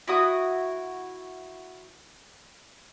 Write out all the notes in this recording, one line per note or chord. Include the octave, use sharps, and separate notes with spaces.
E4 F#4 D#6